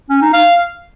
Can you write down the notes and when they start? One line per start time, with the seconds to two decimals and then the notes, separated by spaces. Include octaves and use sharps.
0.10 C#4
0.22 D#4
0.33 F5